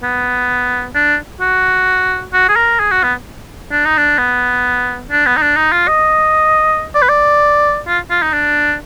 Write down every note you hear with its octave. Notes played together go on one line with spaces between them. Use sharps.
B3
D4
F#4
F#4
G#4
A#4
G#4
F#4
B3
D4
D#4
D4
B3
D4
B3
D#4
D4
D#4
F4
D#5
D5
B4
D5
F4
F4
D#4
D4